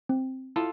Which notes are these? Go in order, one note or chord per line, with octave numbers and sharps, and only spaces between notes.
C4
E4 F4 A4